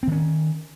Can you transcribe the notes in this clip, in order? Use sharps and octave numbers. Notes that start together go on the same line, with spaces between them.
D#3 C4 C#4